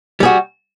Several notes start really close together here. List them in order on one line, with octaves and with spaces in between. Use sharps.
G3 G#4 F#4